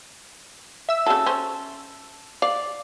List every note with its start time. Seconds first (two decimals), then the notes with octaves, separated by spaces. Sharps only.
0.89 E5 E6
1.06 C#3 F#3 A4
1.26 C#4 C5
2.42 D5 F5